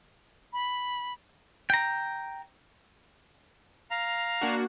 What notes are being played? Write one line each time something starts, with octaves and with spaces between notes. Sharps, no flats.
B5
G5 A#5
F5 A#5
A#3 D4 F#4